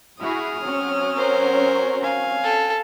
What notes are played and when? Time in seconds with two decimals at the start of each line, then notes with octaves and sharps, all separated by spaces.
0.20 E4 F#4 G#4 D#6 F6
0.62 F#3 C4 C#4
1.16 A#4 C5
2.03 F5 G#5
2.44 A4